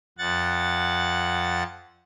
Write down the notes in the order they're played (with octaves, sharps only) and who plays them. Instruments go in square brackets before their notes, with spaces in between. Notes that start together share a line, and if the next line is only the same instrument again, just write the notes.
[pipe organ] F2 F#5 A6